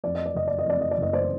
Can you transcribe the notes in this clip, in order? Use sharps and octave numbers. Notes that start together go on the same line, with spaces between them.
F2 D5
D#5
D5
F#1 D#5
D5
D#5
F2 D5
D#5
D5
F#1 D#5
C5 D5